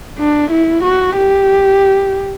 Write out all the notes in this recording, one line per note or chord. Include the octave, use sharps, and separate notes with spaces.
D4
E4
F#4
G4